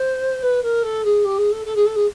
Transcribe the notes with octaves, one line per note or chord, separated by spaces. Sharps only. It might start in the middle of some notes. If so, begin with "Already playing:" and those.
Already playing: C5
B4
A#4
A4
G#4
G4
G#4
A4
A4
G#4
A4
G#4